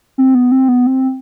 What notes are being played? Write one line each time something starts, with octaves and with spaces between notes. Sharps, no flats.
C4
B3
C4
B3
C4